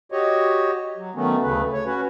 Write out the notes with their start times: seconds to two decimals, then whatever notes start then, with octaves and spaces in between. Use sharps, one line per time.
0.12 F#4 G4 C#5 D#5
0.97 F#3
1.15 D#3 F#3 A3 B3 C#4
1.43 D2 C#3 A3 B4
1.73 C#5
1.86 C#4 F#4 B4